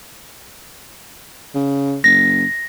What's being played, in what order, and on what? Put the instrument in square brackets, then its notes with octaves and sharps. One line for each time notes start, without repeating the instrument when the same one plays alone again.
[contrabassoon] C#3
[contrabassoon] F#1 [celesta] A#6